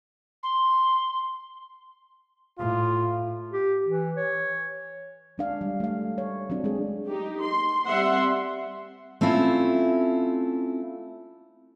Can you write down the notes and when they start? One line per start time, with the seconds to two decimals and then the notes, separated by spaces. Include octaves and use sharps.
0.43 C6
2.58 A2 F4
3.53 G4
3.87 E3
4.17 C#5
5.38 G#3 D4 F5
5.61 G3
5.80 A3 F5
6.18 C#5
6.50 F#3 C4 D4
6.64 G#3 G#4
7.07 D#4 G4
7.44 C6
7.85 G3 C4 E5 F#5 C6
9.21 A3 C4 C#4 E4 F4